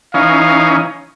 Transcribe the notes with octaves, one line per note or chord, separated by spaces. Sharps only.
E3 C#4 D#4 F5